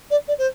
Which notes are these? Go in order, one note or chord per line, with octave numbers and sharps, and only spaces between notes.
D5
D5
C5